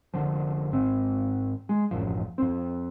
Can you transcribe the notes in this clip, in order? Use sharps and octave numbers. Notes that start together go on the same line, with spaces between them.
F1 D3 F3
G#1 C4
G#3
E1 A1 F#2 F3
F2 C4